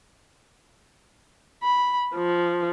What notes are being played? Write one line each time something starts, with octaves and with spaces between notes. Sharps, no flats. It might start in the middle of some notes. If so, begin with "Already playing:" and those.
B5
F3